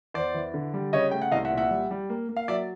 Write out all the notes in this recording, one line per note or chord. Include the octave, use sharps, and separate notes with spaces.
E2 C5 D5
E3
D3
G3
C#3 C#5 D#5
A3 G5
F#5
C2 D#5 F5
E5 F#5
A#2
E5 F#5
G3
G3
A#3
A#3
F5
F#3 D5 E5